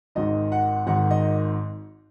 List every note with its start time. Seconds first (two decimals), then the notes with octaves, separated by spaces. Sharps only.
0.15 G#1 G#2 D#3 D#5
0.52 F#5
0.87 G#1 G#2 D#3 F#5
1.11 D#5